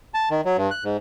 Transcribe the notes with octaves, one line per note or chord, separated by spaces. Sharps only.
A5
D#3
F#3
G2
F#6
G#2